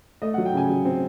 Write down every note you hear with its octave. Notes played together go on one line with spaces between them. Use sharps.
A3 D#5
F#3 F#5
G5
C#3 G#5
F#3
C4